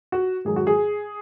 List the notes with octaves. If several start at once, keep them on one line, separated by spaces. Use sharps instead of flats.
F#4
G#2 D#3 F#3 G#4
F#4
G#4